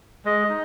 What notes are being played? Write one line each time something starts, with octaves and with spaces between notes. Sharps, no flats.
G#3 D#5
D#4